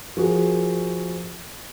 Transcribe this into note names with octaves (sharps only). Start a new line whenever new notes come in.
F3 F#4 G#4 A#4